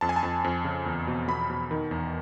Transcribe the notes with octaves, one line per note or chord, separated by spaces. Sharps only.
F2 A5
G#5
A5
F2
F2
C#3
E2
B2
B2 B5
B2
D#3
E2